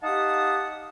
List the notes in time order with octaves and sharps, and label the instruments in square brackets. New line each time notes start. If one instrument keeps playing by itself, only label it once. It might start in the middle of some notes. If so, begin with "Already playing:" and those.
[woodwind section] D#4 G4 F5 F#5 A5 D#6